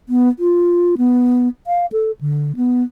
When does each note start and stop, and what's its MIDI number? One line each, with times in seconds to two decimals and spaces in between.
0.09 0.29 59
0.39 0.95 65
0.98 1.48 59
1.67 1.86 77
1.92 2.12 69
2.21 2.56 50
2.56 2.83 59